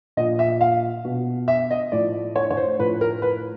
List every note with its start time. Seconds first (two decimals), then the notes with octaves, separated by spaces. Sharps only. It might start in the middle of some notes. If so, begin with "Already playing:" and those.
0.17 A#2 D#5
0.20 F3
0.39 E5
0.61 F5
1.05 B2
1.48 E5
1.71 D#5
1.92 A2 F3 D5
2.36 C#5
2.50 C#5
2.57 C5
2.79 A2 F3 B4
3.01 A#4
3.22 B4